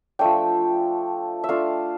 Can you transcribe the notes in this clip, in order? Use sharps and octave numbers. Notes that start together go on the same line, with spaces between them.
F3 A3 D4 G5
E5
A3 D4 F4 F5